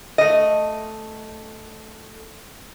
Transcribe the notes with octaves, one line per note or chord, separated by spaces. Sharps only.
A3 D#5